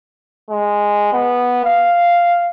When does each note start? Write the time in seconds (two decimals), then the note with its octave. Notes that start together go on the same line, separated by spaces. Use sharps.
0.50 G#3
1.13 B3
1.65 F5